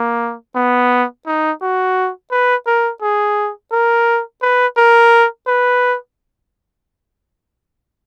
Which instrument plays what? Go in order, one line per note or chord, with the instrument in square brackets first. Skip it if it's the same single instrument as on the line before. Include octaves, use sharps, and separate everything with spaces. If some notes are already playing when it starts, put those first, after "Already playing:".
Already playing: [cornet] A#3
B3
D#4
F#4
B4
A#4
G#4
A#4
B4
A#4
B4